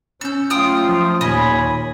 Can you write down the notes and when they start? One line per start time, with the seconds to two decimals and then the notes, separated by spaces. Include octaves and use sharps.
0.21 C#4 E6 G6
0.50 F#3 A3 F4 G5 D#6 F6
0.83 F3
1.21 D#2 A#2 C#5 D#5 G#5 B5 C6